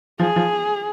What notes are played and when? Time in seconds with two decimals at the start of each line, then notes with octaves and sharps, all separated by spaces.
0.20 F3 G#4
0.36 F3